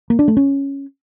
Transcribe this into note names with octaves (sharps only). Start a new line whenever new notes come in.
A#3
D4
A3
C#4